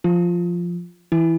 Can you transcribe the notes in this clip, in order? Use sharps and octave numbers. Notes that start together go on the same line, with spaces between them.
F3 F4
E3 E4